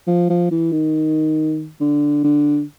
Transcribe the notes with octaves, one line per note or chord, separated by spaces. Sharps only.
F3
F3
E3
D#3
D3
D3